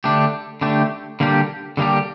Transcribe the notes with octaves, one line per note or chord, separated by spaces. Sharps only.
D3 A3 D4 G4
D3 A3 D4 G4
D3 G3 A#3 D4 G4
D3 G3 A#3 D4 G4